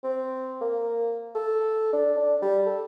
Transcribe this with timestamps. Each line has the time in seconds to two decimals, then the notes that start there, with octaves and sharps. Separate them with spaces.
0.04 C4
0.61 A#3
1.35 A4
1.93 D4
2.17 D4
2.42 G3
2.66 A4